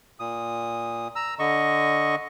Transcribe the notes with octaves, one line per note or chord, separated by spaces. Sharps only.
A#2 D#6
A#5 E6
D3 D#5 C#6